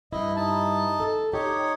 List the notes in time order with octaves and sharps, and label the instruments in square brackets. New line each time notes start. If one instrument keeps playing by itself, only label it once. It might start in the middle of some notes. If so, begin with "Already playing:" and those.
[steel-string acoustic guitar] G2 E4 [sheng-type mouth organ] D#5
[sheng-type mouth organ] D#4 A5
[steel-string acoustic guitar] A4
[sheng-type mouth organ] D#4 C#5 [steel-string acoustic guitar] G4